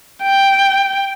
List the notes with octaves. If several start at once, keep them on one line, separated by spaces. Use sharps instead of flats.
G5